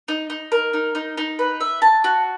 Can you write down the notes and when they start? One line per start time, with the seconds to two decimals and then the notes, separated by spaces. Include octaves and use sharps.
0.08 D#4
0.30 D#4
0.52 A#4
0.73 D#4
0.95 D#4
1.17 D#4
1.39 B4
1.61 E5
1.82 A5
2.04 F#4